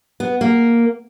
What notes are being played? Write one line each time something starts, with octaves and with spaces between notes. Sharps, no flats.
B3
A#3